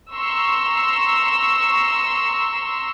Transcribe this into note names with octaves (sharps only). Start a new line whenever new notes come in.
A#5 C6 C#6 E6